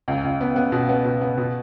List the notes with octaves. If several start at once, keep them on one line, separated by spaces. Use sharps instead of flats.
C#2
C#2
B3
B3
B2
B3
B2
B3
B2